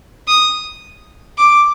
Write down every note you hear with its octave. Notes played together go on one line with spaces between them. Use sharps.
D#6
D6